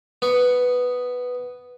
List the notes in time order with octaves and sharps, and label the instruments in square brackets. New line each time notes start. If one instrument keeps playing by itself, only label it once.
[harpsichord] B3 C#6